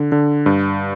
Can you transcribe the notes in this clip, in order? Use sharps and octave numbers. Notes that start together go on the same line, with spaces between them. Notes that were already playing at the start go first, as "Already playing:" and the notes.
Already playing: D3
D3
G2